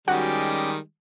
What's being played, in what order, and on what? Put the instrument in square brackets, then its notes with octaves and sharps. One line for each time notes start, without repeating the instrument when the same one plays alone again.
[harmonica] D#3 G3 G#3 [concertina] C#4 G5 D6 [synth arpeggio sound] F#4